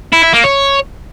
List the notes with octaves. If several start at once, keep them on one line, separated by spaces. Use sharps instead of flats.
E4
E4
A#3
C#5